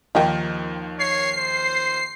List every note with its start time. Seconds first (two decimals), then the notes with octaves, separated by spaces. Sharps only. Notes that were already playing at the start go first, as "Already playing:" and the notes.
0.15 D#2 D#3 F3 D#4 A#4 G5
0.99 C#5 C7
1.38 C5